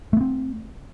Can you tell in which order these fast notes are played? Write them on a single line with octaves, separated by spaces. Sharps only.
A3 B3 C4